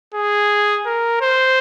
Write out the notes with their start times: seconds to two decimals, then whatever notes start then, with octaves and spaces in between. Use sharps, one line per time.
0.14 G#4
0.86 A#4
1.21 C5